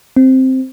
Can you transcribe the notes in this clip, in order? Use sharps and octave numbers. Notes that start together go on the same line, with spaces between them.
C4